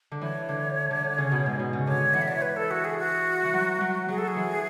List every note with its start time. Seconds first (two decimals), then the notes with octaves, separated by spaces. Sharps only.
0.11 D3
0.21 E3 C#5
0.49 D3
0.91 D3
1.04 D3
1.18 C#3
1.32 B2
1.46 G#2
1.59 B2
1.73 C#3
1.87 D3 C#5
2.14 E3 F#5
2.21 E5
2.28 D5
2.35 C#5
2.42 B4
2.56 A4
2.71 F#4
2.85 G#4
2.98 F#4
3.45 E3
3.53 F#3
3.81 F#3
4.09 F#3 G#4
4.18 A4
4.28 G#4
4.36 E3